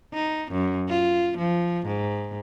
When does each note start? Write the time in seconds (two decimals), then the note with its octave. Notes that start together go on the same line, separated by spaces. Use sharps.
0.14 D#4
0.52 F#2
0.89 F4
1.38 F3
1.87 G#2